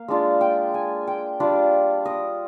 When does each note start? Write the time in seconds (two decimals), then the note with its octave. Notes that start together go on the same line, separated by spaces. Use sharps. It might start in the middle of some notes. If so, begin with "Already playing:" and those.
Already playing: A#3 F5
0.08 G#3 D4 F4
0.41 G5
0.74 G#5
1.07 G5
1.40 G3 D4 F4
2.05 D#5